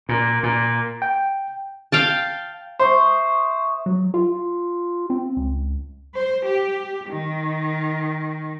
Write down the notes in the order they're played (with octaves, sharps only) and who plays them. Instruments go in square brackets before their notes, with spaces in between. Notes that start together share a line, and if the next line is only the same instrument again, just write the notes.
[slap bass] A#2
A#2
[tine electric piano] G5
[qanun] F5 G5 A5
[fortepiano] C5 [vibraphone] E5 C#6 D#6
[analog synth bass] F#3
F4
C4
C#2
[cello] C5
G4
D#3